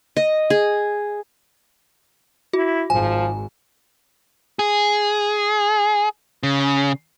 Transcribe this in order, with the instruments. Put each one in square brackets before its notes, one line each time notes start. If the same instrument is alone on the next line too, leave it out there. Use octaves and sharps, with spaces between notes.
[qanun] D#5
G#4
[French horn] E4 [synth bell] F#4
[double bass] G#1 G#2 [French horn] F3 [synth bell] G#5
[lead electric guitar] G#4
C#3